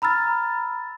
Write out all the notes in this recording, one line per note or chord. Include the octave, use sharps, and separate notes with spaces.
A#5 B5 E6 F6 A6